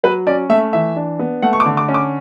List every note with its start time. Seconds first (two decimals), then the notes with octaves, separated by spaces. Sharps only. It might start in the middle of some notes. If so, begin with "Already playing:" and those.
0.03 F#3 B4
0.27 C#4 D5
0.49 A3 E5
0.73 E3 E5
0.96 D4
1.19 B3
1.42 A3 F#5
1.53 C#6
1.60 D6
1.66 D3
1.77 D6
1.89 C#4
1.94 D6